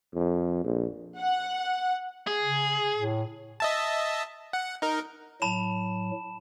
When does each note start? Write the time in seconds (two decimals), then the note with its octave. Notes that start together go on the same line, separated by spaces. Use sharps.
0.14 F2
0.64 A#1
1.20 F#5
2.27 G#4
2.42 C#3
2.96 A2
3.60 D#5 E5 A5
4.53 F#5
4.82 D#4 A#4
5.42 A2 F#3 A5 B5 E7